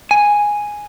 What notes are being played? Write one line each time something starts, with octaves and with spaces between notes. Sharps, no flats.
G#5